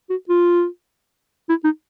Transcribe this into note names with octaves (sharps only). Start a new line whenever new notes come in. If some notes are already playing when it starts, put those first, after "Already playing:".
F#4
F4
E4
D#4